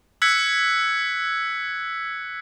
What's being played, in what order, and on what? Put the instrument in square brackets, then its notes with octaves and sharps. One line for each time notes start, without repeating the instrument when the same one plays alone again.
[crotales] E6 F#6 G#6 B6 C#7